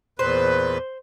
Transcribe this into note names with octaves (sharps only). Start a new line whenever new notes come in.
E2 A#2 B4 C5